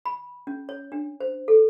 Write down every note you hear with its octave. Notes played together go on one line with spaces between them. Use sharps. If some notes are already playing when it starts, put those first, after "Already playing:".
B5
C#4
C#5
D4
C5
A4